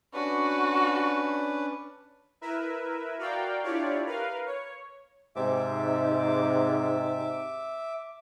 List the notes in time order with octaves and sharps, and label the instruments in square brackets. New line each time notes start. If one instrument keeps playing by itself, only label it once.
[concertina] C#4 D4 B4 [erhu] F#4
[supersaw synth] E4 A#4 B4 E5
F#4 A#4 D5 F5 G5
D4 E4 F4 G4 C#5 D5
A#4 B4 F5
C#5
[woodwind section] G#2 C3 [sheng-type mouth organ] E5 D6